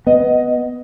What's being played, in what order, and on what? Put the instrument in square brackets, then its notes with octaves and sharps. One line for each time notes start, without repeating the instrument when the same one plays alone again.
[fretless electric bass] B3 [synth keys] D#5